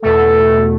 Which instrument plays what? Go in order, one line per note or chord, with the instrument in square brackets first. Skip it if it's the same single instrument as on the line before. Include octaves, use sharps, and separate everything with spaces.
[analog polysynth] E2 B2 A3 [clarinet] A4